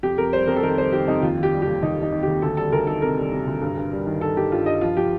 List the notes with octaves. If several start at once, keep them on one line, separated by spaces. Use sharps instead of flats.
F2 G4
F2 A#4
G3 C5
F2 A#4
A4
D#3 A#4
G3 C5
D#3 G4
F2 D#4
D#2 F4
D#3
G4
G3
G4
D#2
D#2 D#4
D#2 D#4
D#3
D#2 G4
D2 A4
G3 A4
D2 A#4
D#3 A4
C3 A#4
G3
C3
D2
G2
G2
G3
D#3
G2 A4
D#3 G4
G2 F4
G2 D#5
F3 F4
F3 G4